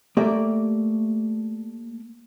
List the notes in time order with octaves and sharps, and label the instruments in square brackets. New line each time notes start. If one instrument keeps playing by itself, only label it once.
[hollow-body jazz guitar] A3 A#3 G4 D5